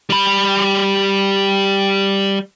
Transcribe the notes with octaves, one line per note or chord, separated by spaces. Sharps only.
G3 B5